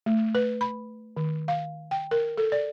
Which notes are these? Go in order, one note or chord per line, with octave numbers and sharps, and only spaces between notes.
A3
B4
B5
D#3
F5
G5
A#4
A4
D5